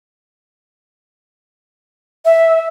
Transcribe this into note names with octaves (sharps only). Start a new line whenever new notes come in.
E5